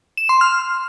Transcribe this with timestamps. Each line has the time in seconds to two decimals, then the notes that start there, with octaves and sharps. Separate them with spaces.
0.17 E7
0.29 C6
0.41 F6